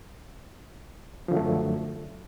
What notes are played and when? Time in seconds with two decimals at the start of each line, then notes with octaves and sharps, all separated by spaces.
1.28 F3
1.31 D3
1.34 F#3
1.37 A3
1.39 F#2